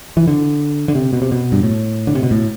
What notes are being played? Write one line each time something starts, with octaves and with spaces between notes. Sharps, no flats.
E3
D3
D3
C3
B2
C3
B2
G2
A2
D3
C3
B2
A2